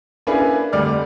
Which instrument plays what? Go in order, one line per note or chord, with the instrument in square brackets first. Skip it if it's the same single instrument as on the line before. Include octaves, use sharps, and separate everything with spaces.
[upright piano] A#3 C#4 D4 E4 G#4 B4
F1 D2 G3 D5 F6